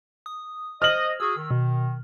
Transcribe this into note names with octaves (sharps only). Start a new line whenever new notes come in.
D#6
C5 D#5 F6 F#7
F#4 G#4 E6
D#3
B2